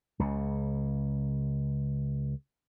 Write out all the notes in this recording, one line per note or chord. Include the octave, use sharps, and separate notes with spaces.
C#2 C#3